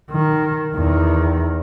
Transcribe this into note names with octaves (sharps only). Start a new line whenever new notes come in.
D#3
E2 D#3